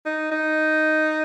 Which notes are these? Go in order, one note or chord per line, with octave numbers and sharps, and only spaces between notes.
D#4
D#4